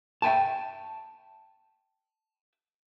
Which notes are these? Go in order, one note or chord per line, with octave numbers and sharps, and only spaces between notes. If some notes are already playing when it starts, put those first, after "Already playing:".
E5 G5 A5